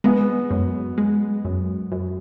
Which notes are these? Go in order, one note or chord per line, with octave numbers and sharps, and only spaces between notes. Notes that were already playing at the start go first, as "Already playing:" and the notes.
G#3 B3
F#2
G#3
F#2
F#2